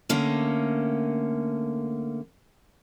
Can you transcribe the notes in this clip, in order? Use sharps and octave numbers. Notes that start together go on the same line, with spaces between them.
D3 A3 A#3 C#4